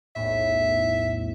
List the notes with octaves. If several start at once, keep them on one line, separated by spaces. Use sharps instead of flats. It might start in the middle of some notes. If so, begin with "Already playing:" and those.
B1 E2 A2 E5